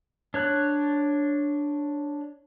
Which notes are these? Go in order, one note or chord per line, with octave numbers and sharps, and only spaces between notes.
D4 C#5 F#6